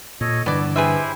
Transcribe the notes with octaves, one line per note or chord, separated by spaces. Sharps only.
A#2 A4 C#5 D#5
G2 D3 E3 B3 D5 A5
E4 G4 G#4 B4 C5 E5